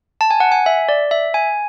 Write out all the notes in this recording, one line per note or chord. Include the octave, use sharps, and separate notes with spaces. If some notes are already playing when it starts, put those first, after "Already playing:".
A5
G#5
F#5
G#5
E5
D5
E5
G#5